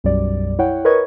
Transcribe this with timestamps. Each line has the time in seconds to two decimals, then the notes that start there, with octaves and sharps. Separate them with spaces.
0.04 B1 F#2 G3 D5
0.59 E4 C#5 F#5 G5
0.85 A#4 B4 C#5 D#5 C#6 G#6